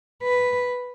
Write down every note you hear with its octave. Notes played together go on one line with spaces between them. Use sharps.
B4